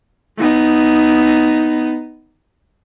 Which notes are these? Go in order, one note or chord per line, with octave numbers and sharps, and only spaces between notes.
B3 D#4